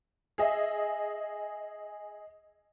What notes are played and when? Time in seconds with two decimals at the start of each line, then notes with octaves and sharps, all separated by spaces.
0.38 G#4 D#5 E5